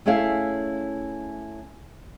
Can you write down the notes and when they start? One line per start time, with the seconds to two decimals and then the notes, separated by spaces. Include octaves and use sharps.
0.06 A3 C#4 E4 G#4 E5 F5